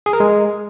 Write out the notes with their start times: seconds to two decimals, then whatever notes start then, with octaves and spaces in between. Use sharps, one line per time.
0.06 G#4
0.13 A#4
0.20 G#3